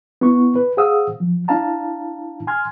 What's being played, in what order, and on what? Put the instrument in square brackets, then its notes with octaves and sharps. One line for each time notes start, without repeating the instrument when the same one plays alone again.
[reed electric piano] B3 E4 C#6
B4
G#4 C5 F5 F#5 D#6 E6
F3
D4 E4 F5 A5 A#5
G#5 C6 F6 G#6